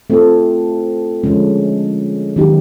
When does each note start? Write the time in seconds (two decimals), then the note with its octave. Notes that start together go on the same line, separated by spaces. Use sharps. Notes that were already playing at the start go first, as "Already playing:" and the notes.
0.10 A3 C4 F4 A4
1.24 D3 F3 G#3 C#4
2.36 D#3 F#3 B3 D#4 G4